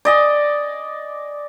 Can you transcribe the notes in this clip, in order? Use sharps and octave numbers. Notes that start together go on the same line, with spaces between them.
D5 D#5 G#5